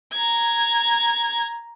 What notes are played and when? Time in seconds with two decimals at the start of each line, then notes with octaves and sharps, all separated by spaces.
0.13 A#5 G#6